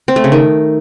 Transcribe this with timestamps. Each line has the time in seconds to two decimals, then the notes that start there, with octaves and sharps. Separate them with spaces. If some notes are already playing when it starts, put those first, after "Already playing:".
0.08 C4
0.16 A3
0.24 C#3
0.32 D#3